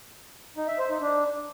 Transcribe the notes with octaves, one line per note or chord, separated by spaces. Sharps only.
D#4
E5
C5
D#4
D4